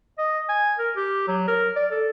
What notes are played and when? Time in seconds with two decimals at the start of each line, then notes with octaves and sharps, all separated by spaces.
0.18 D#5
0.49 G#5
0.79 A#4
0.96 G4
1.28 F#3
1.48 A#4
1.76 D5
1.91 A4